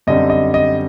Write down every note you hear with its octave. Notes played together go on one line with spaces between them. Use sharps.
F#2 D3 G3 C4 D#5
D#5
D#5